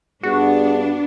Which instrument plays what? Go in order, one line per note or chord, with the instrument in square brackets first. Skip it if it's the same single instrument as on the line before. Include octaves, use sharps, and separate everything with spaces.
[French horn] G2 [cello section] B3 D4 [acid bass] F#4 [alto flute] G#4